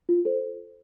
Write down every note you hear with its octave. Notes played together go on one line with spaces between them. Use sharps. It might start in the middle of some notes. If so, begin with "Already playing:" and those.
F4
A4 C5